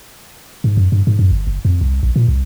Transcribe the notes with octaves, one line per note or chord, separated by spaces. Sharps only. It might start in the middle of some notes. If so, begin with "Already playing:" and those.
G#2
F#2
G2
G#2
F#2
G1
F#1
F2
C2
A#1
A#2
C2